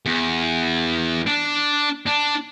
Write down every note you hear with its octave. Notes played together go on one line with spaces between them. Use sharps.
E2
D4
D4